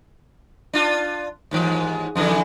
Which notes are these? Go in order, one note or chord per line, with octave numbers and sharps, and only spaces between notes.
D4 F4
D#2 G#2 E3
F2 D3 E3